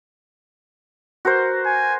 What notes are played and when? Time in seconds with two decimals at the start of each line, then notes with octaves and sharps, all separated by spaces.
1.25 F#4 A#4 C5
1.66 G#5